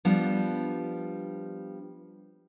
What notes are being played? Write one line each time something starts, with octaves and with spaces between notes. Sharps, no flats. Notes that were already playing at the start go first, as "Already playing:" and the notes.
F3 G3 B3 D4